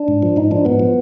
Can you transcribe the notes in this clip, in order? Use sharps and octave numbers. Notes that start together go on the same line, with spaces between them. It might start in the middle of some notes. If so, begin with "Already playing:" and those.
Already playing: D4
G#2
F3
G#2 D#4
F3 D4
G#2 B3
F3